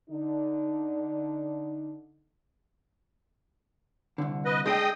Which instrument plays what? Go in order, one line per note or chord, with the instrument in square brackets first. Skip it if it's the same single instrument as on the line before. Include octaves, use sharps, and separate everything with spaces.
[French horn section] D3 D#4
[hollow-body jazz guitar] C2 D3
[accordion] B4 D#5
[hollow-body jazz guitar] G#3 D4 A4 [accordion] D#5 G5 D#6